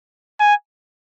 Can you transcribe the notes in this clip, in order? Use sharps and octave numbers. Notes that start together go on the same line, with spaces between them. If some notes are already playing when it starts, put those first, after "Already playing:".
G#5